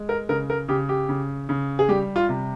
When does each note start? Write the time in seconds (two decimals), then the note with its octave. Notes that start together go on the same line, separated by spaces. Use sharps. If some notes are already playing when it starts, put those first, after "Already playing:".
Already playing: G#3
0.09 A#4
0.29 C#3 A#4
0.50 A#4
0.68 C#3 G4
0.89 G4
1.09 C#3
1.49 C#3
1.79 G#4
1.89 G3 G4
2.16 F4
2.29 C3